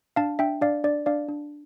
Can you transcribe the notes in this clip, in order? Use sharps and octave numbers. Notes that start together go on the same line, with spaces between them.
D4 F5 A5
D4 E5 G5
D4 D5 F5
D4 D5
D4 D5 F5
D4